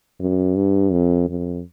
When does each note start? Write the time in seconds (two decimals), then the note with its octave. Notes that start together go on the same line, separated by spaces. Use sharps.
0.20 F#2
0.56 G2
0.92 F2
1.29 F2